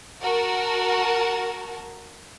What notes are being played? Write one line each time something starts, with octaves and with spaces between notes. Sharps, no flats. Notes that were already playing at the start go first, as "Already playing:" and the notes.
F#4 A#4 A5